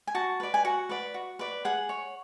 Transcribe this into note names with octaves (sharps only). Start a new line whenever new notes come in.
G#5
F#4 A5
B4 D5
G#5
F#4 F#5
B4 D5
F#4
B4 D5
G#4 F#5
C#5